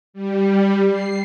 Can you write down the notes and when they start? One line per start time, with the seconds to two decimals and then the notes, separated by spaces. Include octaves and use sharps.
0.14 G3
0.89 C7